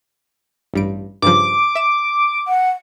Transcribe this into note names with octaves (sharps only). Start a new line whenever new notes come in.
A1 G2 D7
G2 C#3 F3 D6
E5 E7
F#5